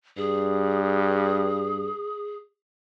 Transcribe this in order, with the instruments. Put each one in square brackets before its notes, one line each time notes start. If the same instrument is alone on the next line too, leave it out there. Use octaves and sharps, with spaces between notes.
[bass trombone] G2 [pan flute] G#4